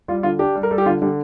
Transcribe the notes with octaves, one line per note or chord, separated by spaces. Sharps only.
G3 F4
D3 F4
D4 G4
G3
A#4
G3 A4
G4
D3 F4
D3 G3